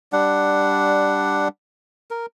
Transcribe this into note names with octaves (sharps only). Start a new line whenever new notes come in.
G3 D4 F#5
A#4